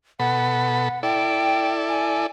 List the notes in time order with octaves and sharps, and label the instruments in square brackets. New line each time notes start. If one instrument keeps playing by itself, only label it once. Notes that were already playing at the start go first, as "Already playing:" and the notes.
[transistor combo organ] B2 A4 B5 [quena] F#5
[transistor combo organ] E4 A4 D5 [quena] G5
[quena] G#5